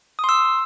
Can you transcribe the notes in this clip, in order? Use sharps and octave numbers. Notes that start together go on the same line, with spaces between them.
C6 D#6 E6